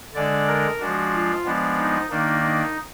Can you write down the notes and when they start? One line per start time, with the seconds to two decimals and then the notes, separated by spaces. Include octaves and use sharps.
0.14 D3 G#3 D4 D5
0.47 A#4
0.80 F3 G#3 D4 F#4
1.13 F4
1.45 F3 G#3 B3 D4
1.77 D#4
2.10 D#3 A#3 D4 D#4
2.43 D#4